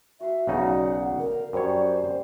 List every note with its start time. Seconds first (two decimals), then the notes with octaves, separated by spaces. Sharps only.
0.20 F#4 E5 A#5 C6
0.47 B1 C#3 D#4 C5 D5 F5 F#5
1.19 A#4
1.53 F#2 G3 C5 C#5